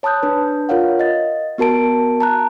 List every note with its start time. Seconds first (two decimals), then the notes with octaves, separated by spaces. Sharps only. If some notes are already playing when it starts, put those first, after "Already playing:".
0.03 C#5 A5 B5 D#6 F#6 G6
0.23 D4 B4
0.69 F4 A#4 C#5 F5 F#5
0.99 D#5 A6
1.58 B3 F#4 A#4 A5 D7
2.20 A5 A#5 F#6